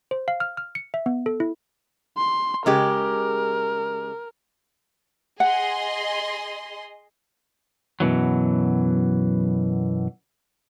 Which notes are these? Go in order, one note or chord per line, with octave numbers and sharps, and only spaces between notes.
C5
F5
F6
F6
C#7
E5
B3
A4
E4
C6
C#3 G#3 G4 A#4
G#4 D#5 F#5 C6
F#2 B2 E3 F#3